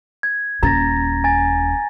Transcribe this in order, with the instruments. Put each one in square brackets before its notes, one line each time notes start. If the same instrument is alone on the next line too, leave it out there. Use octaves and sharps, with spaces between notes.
[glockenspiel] G#6
[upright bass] D#1 C#4 [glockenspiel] A#5 A6 A#6
[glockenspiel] G#5 A6